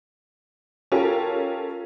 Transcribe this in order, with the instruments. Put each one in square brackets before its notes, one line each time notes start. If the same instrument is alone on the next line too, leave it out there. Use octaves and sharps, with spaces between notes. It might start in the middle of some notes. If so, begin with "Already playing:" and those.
[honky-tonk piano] C#4 F4 G4 A4 A#4